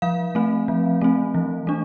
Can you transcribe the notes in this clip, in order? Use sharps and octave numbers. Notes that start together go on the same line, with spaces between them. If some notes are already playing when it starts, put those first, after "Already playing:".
F3 F5
A3 C4
F3
A3 C4
E3
A3 D4